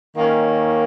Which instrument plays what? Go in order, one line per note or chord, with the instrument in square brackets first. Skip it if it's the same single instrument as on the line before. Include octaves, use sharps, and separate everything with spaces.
[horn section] D#3 A#3 C#4